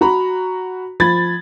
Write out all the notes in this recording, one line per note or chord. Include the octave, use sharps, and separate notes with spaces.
F#4 A#5 B5
F3 B5 G#6 A6